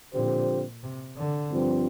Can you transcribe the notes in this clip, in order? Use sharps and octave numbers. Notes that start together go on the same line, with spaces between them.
A#2 D3 F3 C4 G4 C5
C3
D3
G2 F3 C4